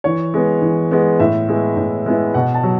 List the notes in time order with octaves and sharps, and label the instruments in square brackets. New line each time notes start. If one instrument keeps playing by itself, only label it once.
[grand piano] E3 C#5
G#3 B3
E3
G#3 B3
A2 E5
G#3 B3 E4
A2
G#3 B3 E4
B2 F#5
A5
F#3